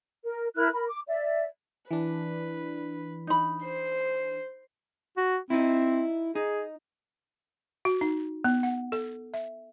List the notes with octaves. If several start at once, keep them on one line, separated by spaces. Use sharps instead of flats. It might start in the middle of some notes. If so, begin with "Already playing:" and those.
A#4
E4 A#4 F6 F#6
A#4 B5
D6
D5 E5
E3 D4 B4
D#4 B5
C5
F#4
C4 D#4 E4
D#4 G#4
F#4
D#4
B3
F#5
A4
E5